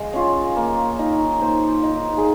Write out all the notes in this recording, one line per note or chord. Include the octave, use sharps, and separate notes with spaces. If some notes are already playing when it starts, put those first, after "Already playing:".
Already playing: G#3 D#5 F5
C#4 F4
A#3
D#4
A#3 C5
D#4
G#4